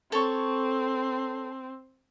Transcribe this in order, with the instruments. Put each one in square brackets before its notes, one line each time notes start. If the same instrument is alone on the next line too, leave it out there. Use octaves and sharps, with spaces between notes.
[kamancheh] C4 [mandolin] A4 C#5